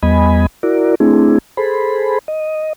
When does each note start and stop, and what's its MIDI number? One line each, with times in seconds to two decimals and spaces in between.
0.03 0.46 40
0.03 0.46 55
0.03 0.46 59
0.03 0.46 75
0.03 0.46 80
0.03 0.46 83
0.63 0.95 64
0.63 0.95 66
0.63 0.95 70
0.63 0.95 74
1.00 1.38 57
1.00 1.38 60
1.00 1.38 62
1.00 1.38 64
1.00 1.38 68
1.57 2.19 68
1.57 2.19 69
1.57 2.19 72
1.57 2.19 83
2.28 2.73 75